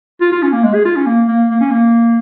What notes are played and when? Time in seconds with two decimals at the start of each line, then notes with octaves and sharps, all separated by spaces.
0.21 F4
0.32 F4
0.42 C#4
0.53 A#3
0.63 G#3
0.74 G#4
0.85 F4
0.96 C#4
1.06 A#3
1.28 A#3
1.50 A#3
1.61 C#4
1.71 A#3